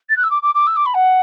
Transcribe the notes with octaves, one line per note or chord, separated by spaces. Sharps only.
A6
F#6
E6
D6
D6
D6
E6
D6
B5
F#5